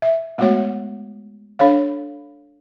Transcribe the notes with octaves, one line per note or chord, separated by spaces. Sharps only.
E5
G#3 A3 B3 F#4 C#5 F#5
D4 A4 C#5 F5